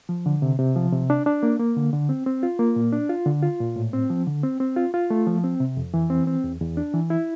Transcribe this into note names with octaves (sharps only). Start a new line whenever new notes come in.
F3
D3
C3
C3
F3
C3
D4
D4
A#3
A#3
D3
D3
C4
C4
F4
A#3
A#2
D4
F4
D3
F4
A#2
A2
C4
F3
D3
C4
C4
F4
F4
A3
F3
C4
C3
F2
E3
C4
C4
E2
E2
D4
E3
E4